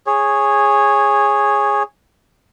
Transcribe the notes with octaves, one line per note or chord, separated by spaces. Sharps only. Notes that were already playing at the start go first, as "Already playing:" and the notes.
G#4 C#5